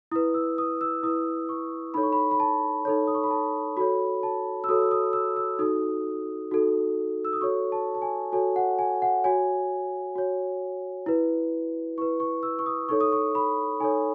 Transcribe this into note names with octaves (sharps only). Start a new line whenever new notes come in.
E4 B4 D#6
E6
D#6
E6
E4 B4 D#6
C#6
D#4 A4 C#5 B5
C#6
B5
B5
A5
D#4 A4 C#5
D#6
C#6
B5
A5
F#4 A4 C#5 B5
A5
E6
F#4 A4 C#5 D#6
E6
D#6
E6
E6
D#4 F#4 A4 D#6
D#4 F#4 A4
E6
D#6
F#4 A4 C#5 C#6
A5
A5
G#5
F#4 A4 C#5 G#5
F#5
G#5
F#5
F#4 C#5 G#5
F#4 C#5
E4 B4
E4 B4 C#6
C#6
E6
C#6
D#6
D#4 A4 C#5 C#6
D#6
C#6
B5
D#4 A4 C#5 G#5